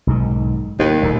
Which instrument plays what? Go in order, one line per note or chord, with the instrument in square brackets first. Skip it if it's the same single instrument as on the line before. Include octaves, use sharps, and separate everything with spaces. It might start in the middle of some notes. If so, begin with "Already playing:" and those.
[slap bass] B1 G#2 D#3
[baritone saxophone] D#2 [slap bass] A#3
[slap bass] D1 A#2 A3